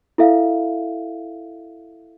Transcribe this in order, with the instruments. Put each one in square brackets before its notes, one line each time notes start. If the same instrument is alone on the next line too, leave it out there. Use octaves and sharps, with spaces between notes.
[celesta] E4 A4 E5 F5